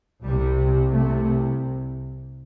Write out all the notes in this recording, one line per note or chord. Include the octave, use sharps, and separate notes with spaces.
C2 C3 G3
C2 C3 A3